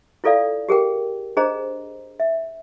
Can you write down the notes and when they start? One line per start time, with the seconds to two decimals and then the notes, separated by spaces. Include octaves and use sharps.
0.24 E4 F4 A4 D5 F5
0.69 G4 G#4 A#4 G5
1.37 D4 G#4 C5 D#5 A#5
2.20 E5